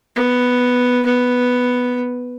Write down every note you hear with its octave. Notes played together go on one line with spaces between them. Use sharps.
B3
B3